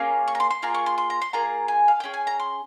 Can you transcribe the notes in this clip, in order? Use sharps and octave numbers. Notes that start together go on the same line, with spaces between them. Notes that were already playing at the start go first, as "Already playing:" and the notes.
Already playing: A#3 C#4 F4 G#4
C#6
A#5
C6
C6
A#3 F4 G#4 A#5
C#6
C6
C6
A#5
C6
A#3 F4 G#4 A#5
G#5
F5
C#4 G#4 G5
G#5
A#5
C6